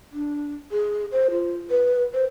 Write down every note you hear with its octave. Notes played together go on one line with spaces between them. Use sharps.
D4
G#4
C5
F4
B4
C5